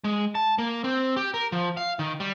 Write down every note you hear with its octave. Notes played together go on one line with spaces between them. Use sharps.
G#3
A5
A#3
C4
G4
A#4
F3
F5
D#3
G3